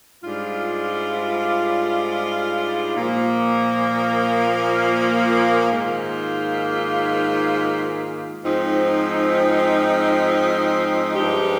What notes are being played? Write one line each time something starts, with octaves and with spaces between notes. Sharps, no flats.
G#2 G3 D4 F4
A#2 F3 A#3
G#2 D#3 A#3 F4
G#2 F3 C4 D#4
G2 F3 G#3 D#4 G4